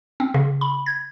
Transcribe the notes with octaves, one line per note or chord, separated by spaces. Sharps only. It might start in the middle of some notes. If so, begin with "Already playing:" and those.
C4
C#3
B5
G#6